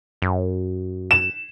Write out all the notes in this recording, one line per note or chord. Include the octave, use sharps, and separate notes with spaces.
F#2
E7